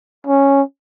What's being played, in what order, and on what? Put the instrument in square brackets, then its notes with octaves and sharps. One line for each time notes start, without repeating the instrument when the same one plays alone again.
[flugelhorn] C#4